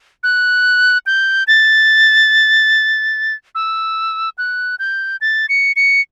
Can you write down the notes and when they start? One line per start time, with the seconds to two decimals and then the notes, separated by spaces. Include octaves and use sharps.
0.23 F#6
1.06 G6
1.47 A6
3.55 E6
4.38 F#6
4.79 G6
5.21 A6
5.49 C#7
5.76 C#7